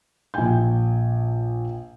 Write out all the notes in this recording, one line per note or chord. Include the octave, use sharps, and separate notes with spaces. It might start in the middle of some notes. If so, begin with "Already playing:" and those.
A#1 A#2 G5 G#5 G6